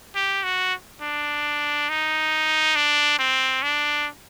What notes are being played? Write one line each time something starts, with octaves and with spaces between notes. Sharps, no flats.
G4
F#4
D4
D#4
D4
C4
D4